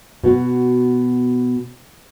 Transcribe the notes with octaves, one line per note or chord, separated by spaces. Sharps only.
B2 F#4